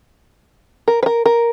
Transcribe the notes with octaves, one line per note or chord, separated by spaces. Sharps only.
A#4
B4
A#4
A#4